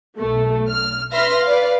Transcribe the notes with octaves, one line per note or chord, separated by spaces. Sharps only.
B1 A3
F6
B4 E5 C6 F6 A#6
B4 D5 F5